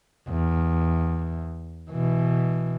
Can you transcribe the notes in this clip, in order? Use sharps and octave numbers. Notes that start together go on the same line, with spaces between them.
E2
B2 E3